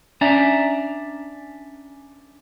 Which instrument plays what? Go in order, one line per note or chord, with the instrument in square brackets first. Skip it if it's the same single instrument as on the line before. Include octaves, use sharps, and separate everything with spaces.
[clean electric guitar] C#4 D4 D5 E5 A#5